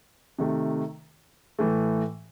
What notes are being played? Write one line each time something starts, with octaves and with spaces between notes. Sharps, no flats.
C3 D#3 A3
A2 E3 A3